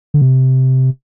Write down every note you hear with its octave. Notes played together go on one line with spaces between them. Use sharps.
D3
C3